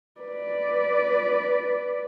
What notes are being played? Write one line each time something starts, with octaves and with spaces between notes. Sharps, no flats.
B4 D5